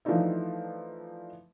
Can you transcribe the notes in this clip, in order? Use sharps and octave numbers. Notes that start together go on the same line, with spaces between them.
E3 F3 A3 D4 D#4 E5